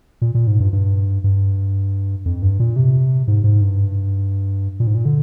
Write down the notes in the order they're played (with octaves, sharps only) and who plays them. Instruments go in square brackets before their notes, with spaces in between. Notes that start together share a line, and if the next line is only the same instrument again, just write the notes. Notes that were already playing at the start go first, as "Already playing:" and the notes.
[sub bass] A#2
A#2
G#2
G2
G2
G2
F2
G2
A#2
C3
G#2
G#2
G2
A#2
G#2
A#2
D3